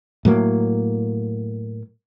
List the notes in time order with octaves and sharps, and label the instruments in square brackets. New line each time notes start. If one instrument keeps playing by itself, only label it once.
[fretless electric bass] A2 F#3 A#3